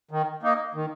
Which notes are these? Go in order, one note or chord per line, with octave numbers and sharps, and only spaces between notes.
D#3
A#3 D#4
D#3